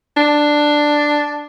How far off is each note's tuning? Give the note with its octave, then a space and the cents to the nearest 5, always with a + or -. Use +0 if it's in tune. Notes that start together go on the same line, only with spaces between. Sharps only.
D4 +5